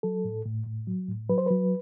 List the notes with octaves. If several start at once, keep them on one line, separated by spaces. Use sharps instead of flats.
F#3 A4
A2
A2
A2
F#3
A2
F#3 B4
C5
F#3 B4